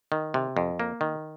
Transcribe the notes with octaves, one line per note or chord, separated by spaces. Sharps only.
D#3
C3
F2
A#3
D#3